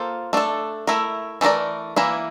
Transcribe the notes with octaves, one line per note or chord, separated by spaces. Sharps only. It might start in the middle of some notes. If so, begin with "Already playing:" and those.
Already playing: A#3 F4 A4 C5
A3 D4 A4
A3 E4 A#4
E3 A3 E4 A#4 D5
E3 A#3 E4